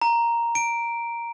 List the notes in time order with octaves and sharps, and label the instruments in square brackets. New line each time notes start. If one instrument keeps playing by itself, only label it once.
[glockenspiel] A#5
D7